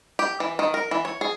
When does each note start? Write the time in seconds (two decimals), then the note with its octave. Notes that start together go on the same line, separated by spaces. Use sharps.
0.19 G4
0.40 E3
0.59 D#3
0.74 A#4
0.91 E3
1.05 C#5
1.21 G#4